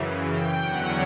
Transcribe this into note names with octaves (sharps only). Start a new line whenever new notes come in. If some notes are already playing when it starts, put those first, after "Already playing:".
Already playing: F#2 C#3 E3
G5
E2 D3 F#3 C#4 F#5